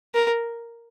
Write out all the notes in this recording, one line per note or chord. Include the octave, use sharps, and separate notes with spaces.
A#4